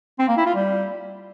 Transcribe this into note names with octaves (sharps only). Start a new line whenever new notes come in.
C4
A#3
E4
F4
G3